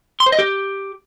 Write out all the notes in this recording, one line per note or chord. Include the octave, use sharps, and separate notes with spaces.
C6
C5
D#5
G4